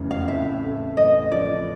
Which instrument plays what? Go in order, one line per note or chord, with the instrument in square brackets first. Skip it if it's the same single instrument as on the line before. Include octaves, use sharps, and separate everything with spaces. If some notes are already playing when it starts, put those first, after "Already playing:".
Already playing: [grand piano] F1 E2 C#3 E3
[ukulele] F5
[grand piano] A2 [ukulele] E5
[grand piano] A3
[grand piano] A1 [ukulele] D#5
[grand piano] F3 [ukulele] D5